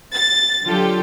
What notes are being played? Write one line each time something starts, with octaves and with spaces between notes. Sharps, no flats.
A6
D3 F#3 F4 G4 A4